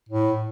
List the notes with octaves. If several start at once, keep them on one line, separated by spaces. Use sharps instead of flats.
A2